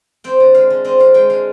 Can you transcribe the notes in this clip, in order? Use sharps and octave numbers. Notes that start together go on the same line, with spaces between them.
C4 G5
D3
G#3 F5
D3
C4 D#5
D3 F5
G#3 G5
D3 F5